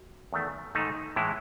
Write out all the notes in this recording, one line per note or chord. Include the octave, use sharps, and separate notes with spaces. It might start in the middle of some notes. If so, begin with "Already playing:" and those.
Already playing: F#4
E2 D#3 A3
G#2 D#3 A3 D#4
A2 E3 G#3 E4